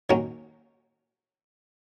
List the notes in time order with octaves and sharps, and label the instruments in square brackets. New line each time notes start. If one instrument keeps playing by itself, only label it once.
[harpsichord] D#3 F#3 A#3 C#4